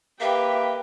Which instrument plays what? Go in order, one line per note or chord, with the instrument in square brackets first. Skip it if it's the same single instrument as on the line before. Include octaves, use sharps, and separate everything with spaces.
[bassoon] A#3 [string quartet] G4 B4 G5 [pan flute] E5